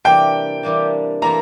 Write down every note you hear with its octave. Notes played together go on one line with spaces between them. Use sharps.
C3 E3 G3 A#3 D4 G5
C3 E3 G3 A#3 D4
E3 A#3 E4 A4 C5 A#5